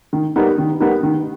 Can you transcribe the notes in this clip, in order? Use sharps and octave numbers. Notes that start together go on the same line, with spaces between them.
D#3
G3 B3 D#4 A#4
D#3
G3 B3 D#4 A#4
D#3